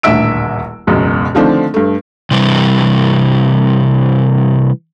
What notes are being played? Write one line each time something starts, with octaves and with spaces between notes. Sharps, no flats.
D#1 A1 D2 E5 E6 D7
E1 C#2 F#2 B2
D3 D#3 F3 A3 C4 D4
G2 A3
C3 E3 G3